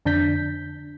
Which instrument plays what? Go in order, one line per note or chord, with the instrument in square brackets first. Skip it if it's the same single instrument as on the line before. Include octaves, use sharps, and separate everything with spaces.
[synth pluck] F2 D3 D4 G6 B6